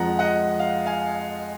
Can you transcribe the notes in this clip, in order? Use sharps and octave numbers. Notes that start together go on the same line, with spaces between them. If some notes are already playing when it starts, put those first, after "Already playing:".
Already playing: F2 F3 G#3 F#5 A#5
D#5 F#5
F5
F5 G#5